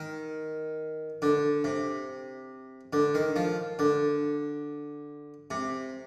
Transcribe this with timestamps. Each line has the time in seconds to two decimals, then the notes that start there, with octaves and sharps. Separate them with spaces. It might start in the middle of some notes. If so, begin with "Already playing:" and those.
Already playing: D#3
1.22 D3
1.64 C3
2.93 D3
3.14 D#3
3.36 F3
3.79 D3
5.51 C3